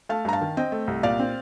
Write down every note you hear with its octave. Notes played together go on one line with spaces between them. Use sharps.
A3 F5 A5
G2 A#5
F5 A5
D#3
C4 D#5 G5
A3
C2
A#2 D5 F5
C4